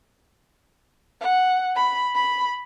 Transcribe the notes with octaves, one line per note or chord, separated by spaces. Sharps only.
F#5
B5
B5